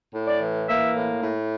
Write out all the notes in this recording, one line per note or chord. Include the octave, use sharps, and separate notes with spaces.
A2
D5
E3
A#3 E5
A2
A2